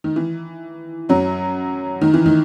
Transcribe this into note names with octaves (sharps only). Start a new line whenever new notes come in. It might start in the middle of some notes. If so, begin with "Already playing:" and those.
D#3
E3
F#2 F#3
D#3
E3
D#3